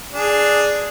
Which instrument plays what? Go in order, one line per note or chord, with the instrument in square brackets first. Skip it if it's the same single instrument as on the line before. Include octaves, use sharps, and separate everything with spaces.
[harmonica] D4 G#4